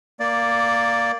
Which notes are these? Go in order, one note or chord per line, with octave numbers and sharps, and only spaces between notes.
A#3 D5